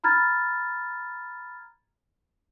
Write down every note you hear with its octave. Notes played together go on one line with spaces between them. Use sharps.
A#5 B5 F6 G#6 A6